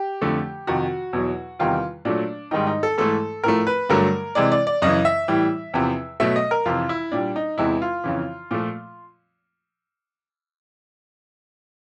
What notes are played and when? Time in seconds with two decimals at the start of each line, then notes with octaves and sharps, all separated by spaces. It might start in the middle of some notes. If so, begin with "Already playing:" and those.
Already playing: G4
0.21 F2 D3 F3 A3
0.67 F2 C3 D#3 F#4
1.13 E2 B2 F#3
1.59 E2 C3 D#3 G3 F4
2.05 A#2 F#3 A3 D4
2.51 G#2 D#3 G3 D#4
2.67 D#4
2.83 A4
2.98 G#2 E3 A3 A4
3.44 A2 F3 A3 A#4
3.67 B4
3.89 G2 D3 F#3 A3 A#4
4.35 C3 E3 G#3 D5
4.52 D5
4.67 D5
4.82 F#2 C#3 E3 D#5
5.05 E5
5.28 A2 E3 G3
5.74 E2 C3 F3
6.20 B2 F#3 A3 E5
6.36 D#5
6.51 A#4
6.66 F2 C3 E3 F4
6.89 E4
7.12 A#2 G3 D4
7.36 D#4
7.58 E2 C3 E3 G#3 E4
7.82 F4
8.04 F2 C#3 E3
8.51 A#2 F3 A3